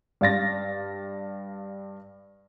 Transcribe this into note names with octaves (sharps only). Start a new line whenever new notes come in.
G2 F5 A6 A#6